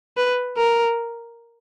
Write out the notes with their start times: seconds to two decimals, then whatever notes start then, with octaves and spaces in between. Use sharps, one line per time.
0.17 B4
0.58 A#4